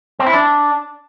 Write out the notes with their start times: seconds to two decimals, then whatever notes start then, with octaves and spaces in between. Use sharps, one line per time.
0.19 C4
0.27 E4
0.34 D4